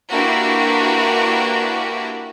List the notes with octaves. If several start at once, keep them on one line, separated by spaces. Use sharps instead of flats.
A#3 D4 E4 F#4 G4 B4